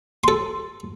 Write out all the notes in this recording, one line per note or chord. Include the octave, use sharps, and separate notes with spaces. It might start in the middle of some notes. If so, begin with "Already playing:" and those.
A4 C6